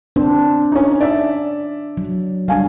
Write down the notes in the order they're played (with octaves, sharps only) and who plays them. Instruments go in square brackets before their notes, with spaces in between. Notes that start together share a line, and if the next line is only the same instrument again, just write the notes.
[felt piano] C4 [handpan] D4
[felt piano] C#4 D#4
D5 E5
[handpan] F#3
[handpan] G3 D4 [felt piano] F5 G#5